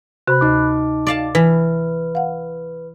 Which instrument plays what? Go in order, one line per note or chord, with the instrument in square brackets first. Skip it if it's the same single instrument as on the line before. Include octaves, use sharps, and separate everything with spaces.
[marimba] C3 F#4 C5 [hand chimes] B5 F#6
[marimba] D2 [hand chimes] D#4 D6
[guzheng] D5 F5 A5
[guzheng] E3 [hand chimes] B4
[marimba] F5 F#5